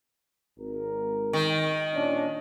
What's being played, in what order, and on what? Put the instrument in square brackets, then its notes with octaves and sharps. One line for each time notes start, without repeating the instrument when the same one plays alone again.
[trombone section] G#1 A#4
[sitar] D#3
[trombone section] A#2 C#4 D4